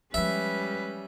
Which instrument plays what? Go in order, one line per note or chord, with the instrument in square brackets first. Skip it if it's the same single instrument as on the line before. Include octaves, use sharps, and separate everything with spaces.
[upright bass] F3 G#3 [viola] G3 C#4 [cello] B4 [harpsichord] E5